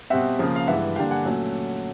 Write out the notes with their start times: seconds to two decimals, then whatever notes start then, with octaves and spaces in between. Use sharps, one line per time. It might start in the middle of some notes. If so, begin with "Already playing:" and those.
0.10 B2 G3 C4 E5 F#5
0.39 C#3 F3 A#3
0.56 F5
0.67 G2 E3 G#3 E5 F#5
0.96 G2 D3 G3 A#3 D4 F5 G5
1.10 F#5 G#5
1.24 A#2 F#3 A3 C#4